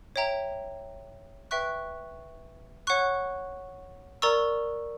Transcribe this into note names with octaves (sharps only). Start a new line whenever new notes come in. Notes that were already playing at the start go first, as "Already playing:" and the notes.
C#5 E5 G5 A#5
B4 E5 G5 C#6 F#6
C#5 F#5 C#6 F#6
A#4 D5 A#5 C#6 E6